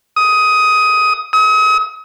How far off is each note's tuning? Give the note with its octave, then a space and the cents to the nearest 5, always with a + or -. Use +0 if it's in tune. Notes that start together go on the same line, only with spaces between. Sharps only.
D#6 +15
D#6 +40